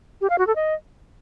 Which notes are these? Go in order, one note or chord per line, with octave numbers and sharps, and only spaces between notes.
G4
F5
F#4
A4
D#5